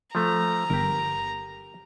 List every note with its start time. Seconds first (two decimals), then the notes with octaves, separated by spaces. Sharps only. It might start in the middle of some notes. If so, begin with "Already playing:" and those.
0.15 F3 A3 A#5
0.70 G1 G4 A#4